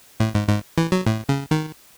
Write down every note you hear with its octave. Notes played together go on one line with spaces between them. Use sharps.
A2
G#2
G#2
E3
F#3
A2
C#3
D#3